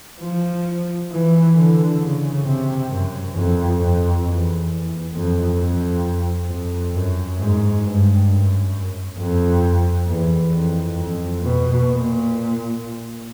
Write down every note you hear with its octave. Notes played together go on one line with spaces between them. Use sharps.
F3
E3
D3
C#3
C3
F#2
F2
F2
E2
F2
F2
F2
F#2
G#2
G2
F#2
F2
E2
F2
F2
B2
A#2